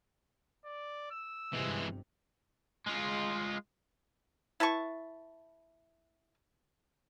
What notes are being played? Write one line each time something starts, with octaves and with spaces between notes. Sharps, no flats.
D5
E6
G1 G2 C3 E3 G#3
G#3 F4
E4 B4 A5 C#6